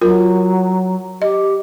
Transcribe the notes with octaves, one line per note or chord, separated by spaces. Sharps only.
F#3 F4 A#4
G4 D#5